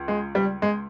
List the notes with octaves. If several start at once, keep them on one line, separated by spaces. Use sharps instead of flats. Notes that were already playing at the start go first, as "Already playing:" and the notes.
Already playing: C#2
G#3
G3
G#3